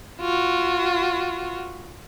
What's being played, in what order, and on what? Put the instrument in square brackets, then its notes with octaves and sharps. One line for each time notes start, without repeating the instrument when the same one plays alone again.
[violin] F4 F#4